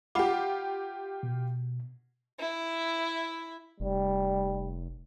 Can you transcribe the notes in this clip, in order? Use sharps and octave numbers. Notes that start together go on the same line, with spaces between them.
F4 G4 F#5 B5 D6
B2
E4 E5
F1 G3